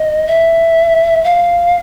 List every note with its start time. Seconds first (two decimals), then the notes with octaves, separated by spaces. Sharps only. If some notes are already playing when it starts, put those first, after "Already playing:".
Already playing: D#5
0.27 E5
1.24 F5